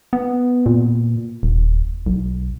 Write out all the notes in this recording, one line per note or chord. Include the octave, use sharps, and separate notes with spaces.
B3
A#2
D#1
B1